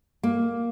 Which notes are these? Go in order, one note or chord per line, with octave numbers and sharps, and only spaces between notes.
A#3